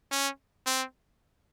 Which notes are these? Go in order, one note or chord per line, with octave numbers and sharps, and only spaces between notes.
C#4
C4